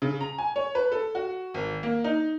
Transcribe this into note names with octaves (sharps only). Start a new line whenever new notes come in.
C#3
A#5
G#5
C#5
B4
A4
F#4
G#1
A#3
D#4